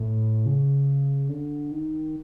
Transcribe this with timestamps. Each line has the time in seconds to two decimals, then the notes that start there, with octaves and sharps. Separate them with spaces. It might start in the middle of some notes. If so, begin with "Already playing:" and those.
Already playing: A2
0.46 C#3
1.29 D3
1.71 D#3